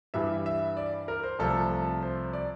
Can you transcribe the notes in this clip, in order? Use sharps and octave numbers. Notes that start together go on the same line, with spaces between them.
G2 E3 G3 E5
E5
D5
A#4
C5
C2 C3 F3 A3 A4
C5
D5